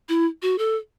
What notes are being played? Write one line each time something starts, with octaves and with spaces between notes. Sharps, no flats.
E4
F#4
A4